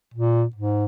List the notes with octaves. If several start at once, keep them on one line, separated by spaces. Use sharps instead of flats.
A#2
G#2